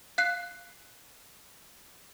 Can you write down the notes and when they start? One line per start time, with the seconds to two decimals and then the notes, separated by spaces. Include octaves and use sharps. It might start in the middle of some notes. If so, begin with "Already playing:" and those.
0.18 F5 F#6 C7